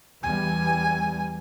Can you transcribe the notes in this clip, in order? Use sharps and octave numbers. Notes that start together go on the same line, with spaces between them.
E2 E3 G3 G#5